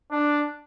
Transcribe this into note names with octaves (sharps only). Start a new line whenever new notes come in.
D4